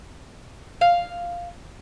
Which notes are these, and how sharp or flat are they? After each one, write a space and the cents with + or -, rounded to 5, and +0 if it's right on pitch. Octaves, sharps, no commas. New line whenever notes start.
F5 +0